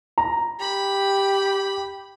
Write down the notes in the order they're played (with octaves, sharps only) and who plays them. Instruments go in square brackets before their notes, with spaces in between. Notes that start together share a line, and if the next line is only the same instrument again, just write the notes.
[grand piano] A#5
[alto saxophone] G4 [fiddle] B5